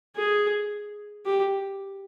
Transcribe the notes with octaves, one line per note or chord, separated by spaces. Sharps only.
G#4
G4